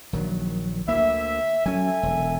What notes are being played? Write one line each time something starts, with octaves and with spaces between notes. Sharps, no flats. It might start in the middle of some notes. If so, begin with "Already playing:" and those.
A#1 D#3 F#3
D2 A#3 E5
F#3 C#4 A4 E5 G#5
E1